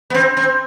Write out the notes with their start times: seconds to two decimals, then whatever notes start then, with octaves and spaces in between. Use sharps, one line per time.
0.10 B3
0.14 C4
0.37 C4